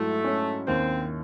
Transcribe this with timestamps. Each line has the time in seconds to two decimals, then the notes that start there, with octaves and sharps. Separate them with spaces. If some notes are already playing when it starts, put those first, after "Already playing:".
Already playing: G#2 F#3 A3 E4
0.24 C#4
0.67 D#2 C4